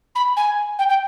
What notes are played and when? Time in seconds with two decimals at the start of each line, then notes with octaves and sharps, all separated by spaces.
0.15 B5
0.36 G#5
0.78 G5
0.89 G5